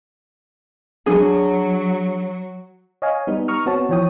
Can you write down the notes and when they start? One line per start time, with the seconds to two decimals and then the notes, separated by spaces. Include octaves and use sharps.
1.06 F#3 D4 G#4
3.02 C#5 D#5 F5 G#5
3.27 G3 B3 D#4
3.48 A#5 C#6 D#6 F6
3.66 B3 C4 F#4 C#5 A5
3.89 E3 F3 C#5 G5 D#6